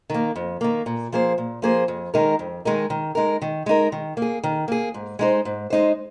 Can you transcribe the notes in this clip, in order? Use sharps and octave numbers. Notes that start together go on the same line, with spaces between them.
D#3 A#3
F2
D#3 A#3
A#2
F3 A#3 G#4 C5
A#2
F3 A#3 G#4 C5
F2
D#3 G#3 D#4 A#4
F2
D#3 G#3 D#4 A#4
D#3
G#3 D#4 A#4
D#3
G#3 D#4 A#4
D#3
A#3
G#4
D#3
A#3 G#4
G#2
G#3 D#4 C5
G#2
G#3 D#4 C5